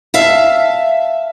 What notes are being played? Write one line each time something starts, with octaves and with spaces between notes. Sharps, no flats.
E5 F5 A5